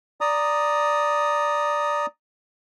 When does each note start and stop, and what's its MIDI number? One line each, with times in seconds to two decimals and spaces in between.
0.21 2.06 74
0.21 2.06 82
0.21 2.06 87